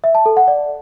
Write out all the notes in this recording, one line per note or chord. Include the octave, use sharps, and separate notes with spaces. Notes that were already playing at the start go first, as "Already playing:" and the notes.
E5
A5
A4
F#5
D5